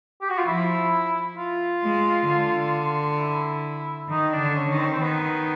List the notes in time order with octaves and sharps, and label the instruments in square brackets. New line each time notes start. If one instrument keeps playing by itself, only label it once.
[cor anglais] G4
F#4
F4
[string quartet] F3 [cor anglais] E4
[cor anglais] F4
[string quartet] G#3
D3
[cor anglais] E4
[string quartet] D#3 [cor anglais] D#4
[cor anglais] D4
[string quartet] D3
[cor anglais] C#4
[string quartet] D#3
[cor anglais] C4
C#4
C4
[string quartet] D#3 [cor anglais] B3